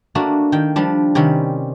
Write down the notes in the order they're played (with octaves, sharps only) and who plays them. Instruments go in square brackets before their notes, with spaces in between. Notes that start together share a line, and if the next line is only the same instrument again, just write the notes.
[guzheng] A3 A#3 D4 F#4
D#3 G5
F3 G3 D4
C3 D#3 G3 C#4